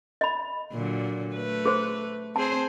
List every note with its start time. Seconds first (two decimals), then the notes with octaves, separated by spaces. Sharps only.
0.21 D#5 B5
0.72 A#2 D3 F#3
1.35 A3 B4
1.66 G#4 C5
2.36 C4 G#4 C5 A5